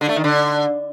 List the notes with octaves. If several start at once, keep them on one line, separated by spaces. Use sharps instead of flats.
D3
A3
D#3
D3